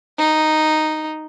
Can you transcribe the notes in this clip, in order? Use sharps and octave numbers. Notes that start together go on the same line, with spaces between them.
D#4